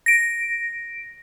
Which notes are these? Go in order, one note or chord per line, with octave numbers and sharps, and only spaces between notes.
A#6 D7